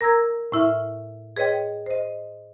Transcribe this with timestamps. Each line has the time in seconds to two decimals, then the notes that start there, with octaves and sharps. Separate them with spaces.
0.01 A#4 A#5 E6 G#6
0.52 A2 E4 E5 F6
1.36 G#4 B4 C#5 D#5 G5
1.86 C5 D#5